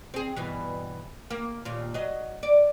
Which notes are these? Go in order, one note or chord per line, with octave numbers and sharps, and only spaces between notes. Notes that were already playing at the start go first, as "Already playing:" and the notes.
C4 G#4
G2 B2 E3
A#3
D#2 A#2
F#3 D#5
D5